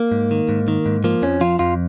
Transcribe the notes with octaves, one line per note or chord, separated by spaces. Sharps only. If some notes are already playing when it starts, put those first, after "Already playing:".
Already playing: A#3
G#2
D#3
G#2
D#3
G#2
F3 A#3
F2 C#4
F3 F4
F2 F4